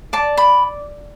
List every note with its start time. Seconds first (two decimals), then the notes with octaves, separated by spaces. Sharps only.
0.13 D5 A5
0.37 B5